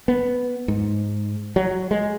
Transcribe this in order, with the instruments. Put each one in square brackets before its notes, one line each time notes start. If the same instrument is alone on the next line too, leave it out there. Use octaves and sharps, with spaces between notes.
[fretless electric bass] B3
G#2
F#3
G#3